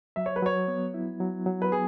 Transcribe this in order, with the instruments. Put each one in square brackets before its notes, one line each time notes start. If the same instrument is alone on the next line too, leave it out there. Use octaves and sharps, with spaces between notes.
[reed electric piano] F#3 [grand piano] E5
[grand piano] C#5
B4
[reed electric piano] F#3 [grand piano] C#5
[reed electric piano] B3
E4
F#3
F#3
[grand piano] B4
[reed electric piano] B3 [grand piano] G#4